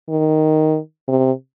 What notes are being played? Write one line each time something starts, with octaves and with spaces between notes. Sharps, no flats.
D#3
C3